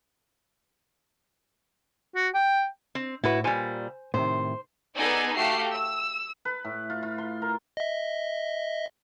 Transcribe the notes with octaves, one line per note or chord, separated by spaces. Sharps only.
F#4
G5
C4
A2 E4 F#4 B4
A#2 G3 C5 G#5
A2 C3 D#3 C5
B3 D#4 G#4 A4 D5 G#5
A3 F#4 G4 F5 C7
E6
B4
A2
F4
F4
C6
A#4
D#5 E5